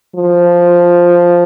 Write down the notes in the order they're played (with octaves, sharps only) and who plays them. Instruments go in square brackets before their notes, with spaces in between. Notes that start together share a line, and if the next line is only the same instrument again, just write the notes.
[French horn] F3